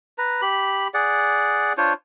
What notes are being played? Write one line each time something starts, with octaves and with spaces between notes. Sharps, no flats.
B4 A#5
G4 B5
G#4 D5 F#5
D4 F4 C5 C#5